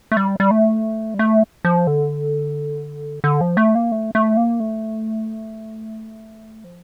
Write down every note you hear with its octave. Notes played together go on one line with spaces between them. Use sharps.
A3
G3
G3
A3
G3
A3
F3
D3
D3
F3
A3
A#3
A3
A3
A#3
A3
F3